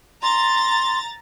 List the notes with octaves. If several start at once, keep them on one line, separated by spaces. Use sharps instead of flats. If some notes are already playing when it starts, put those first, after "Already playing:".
A#5 C6 A6